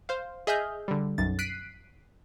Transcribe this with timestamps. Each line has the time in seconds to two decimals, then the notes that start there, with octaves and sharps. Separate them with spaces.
0.09 C5 F5
0.47 G#4 D#5 E5 G#5 F6 G6
0.88 D3 G3
1.18 B1 F#2 A6
1.39 F#6 B6 C7 D7 D#7